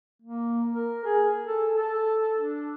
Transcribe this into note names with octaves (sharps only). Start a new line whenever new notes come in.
A#3
A#4
G#4
A4
A4
D4